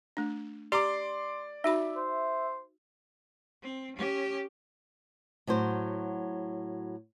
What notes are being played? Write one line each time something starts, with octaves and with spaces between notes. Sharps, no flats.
A3 D4
G4 D5 A#5 C6 D6
D#4 F#4 E5 B5
C5
C4
C#4 G4
A2 F#3 F#4 C5